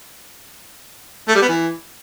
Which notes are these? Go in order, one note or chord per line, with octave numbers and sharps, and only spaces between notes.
A3
G3
B3
E3